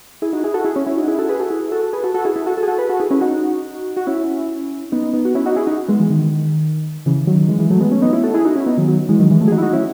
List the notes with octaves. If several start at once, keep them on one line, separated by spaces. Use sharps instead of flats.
E4 G#4
D#4 F#4
E4 G#4
F#4 A4
E4 G#4
C#4 E4
C#4 E4
D#4 F#4
E4 G#4
F#4 A4
G#4 B4
F#4 A4
E4 G#4
F#4 A4
G#4 B4
F#4 A4
F#4 A4
E4 G#4
E4 G#4
F#4 A4
F#4 A4
G#4
F#4 A4
G#4 B4
F#4 A4
E4 G#4
C#4 E4
D#4 F#4
F#4
C#4 E4
B3 D#4
B3 D#4
F#4
C#4 E4
D#4 F#4
E4 G#4
D#4 F#4
G#3 B3
E3 G#3
D#3
C#3 E3
D#3 F#3
E3 G#3
E3 G#3
F#3 A3
G#3 B3
A3 C#4
B3 D#4
C#4 E4
F#4 A4
E4 G#4
D#4 F#4
C#4 E4
B3 D#4
D#3 F#3
D#3 F#3
E3 G#3
D#3 F#3
E3 G#3
F#3 A3
G#4
D#4 F#4
E4
D#4 F#4
C#4 E4